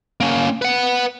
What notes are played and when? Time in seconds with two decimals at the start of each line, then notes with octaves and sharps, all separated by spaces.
0.21 A#3 C#4
0.62 B4 F#5